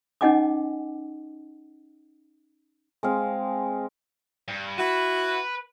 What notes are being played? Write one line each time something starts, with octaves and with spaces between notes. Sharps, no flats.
C#4 D#4 D#5 F#5 G#5 D6
G#3 C4 F5
G2
E4 F#4 B4